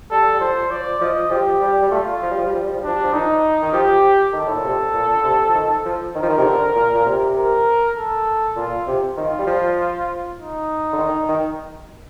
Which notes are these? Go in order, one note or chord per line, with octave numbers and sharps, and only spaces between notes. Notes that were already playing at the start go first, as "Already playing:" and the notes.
G3 A4
G3
F3 C5
F3 D5
F3 D#5
F3 G4
G3
G3
A3 F4
F3
G3
F3
G3
F3
G3
F3
G3
F3 D4
G3
F3
D#3 D#4
D#3
F3 G4
D#3 A4
A2
A#2
C3
A#2
D3
C3
F3
D#3
F3
D#3 A#4
F3
D#3
C3
D3
A#2
A#2
C3
A#4
A4
A#2 F4
C3
D#3 F4
G3
F3
D#4
D3
D#3
D#3